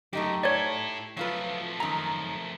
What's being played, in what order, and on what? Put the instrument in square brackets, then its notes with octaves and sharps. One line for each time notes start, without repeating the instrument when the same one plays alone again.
[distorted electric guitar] F#2 [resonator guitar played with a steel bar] A3 D#4 G4
[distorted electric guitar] E4 A4 [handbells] C#5 D5
[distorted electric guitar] F3 A3 [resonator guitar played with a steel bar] F#3 F4 B4
[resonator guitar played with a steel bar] F#2 D#3 [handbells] A#5